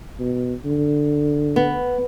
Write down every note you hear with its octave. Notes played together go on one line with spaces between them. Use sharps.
B2
D3
B3